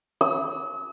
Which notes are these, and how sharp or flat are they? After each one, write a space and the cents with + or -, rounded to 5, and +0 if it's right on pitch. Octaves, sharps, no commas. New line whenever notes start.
E6 -45